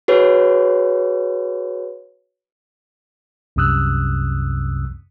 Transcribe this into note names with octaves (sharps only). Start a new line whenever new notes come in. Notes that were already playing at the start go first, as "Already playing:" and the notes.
F#4 G#4 B4 C#5
C2 F#2 C3 D#6 E6 F#6